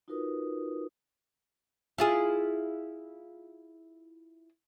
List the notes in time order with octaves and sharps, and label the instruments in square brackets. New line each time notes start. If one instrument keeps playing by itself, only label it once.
[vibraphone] D#4 F4 F#4 A#4 B4 D#6
[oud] E4 F4 G#4